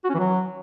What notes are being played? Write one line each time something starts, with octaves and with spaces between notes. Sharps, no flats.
F#4
C#4
E3
F#3